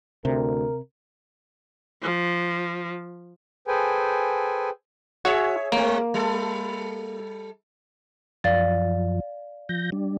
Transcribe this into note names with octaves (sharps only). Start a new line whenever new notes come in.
D2 C3 A#4
F3
G#4 A4 B4 C5 G5 G#5
F#4 G#4 C#5 E5
G#3 A#3 C4
G3 A4
F#2 F3 D5 F5 A6
F3 G6 A#6
G3 D4